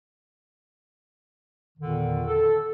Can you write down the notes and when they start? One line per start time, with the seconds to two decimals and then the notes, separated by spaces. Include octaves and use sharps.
1.78 E2 A#2 D3 D#3
2.27 A4